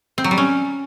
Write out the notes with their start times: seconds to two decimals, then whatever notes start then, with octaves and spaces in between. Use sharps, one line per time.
0.18 C4
0.24 F#3
0.31 G3
0.38 C#4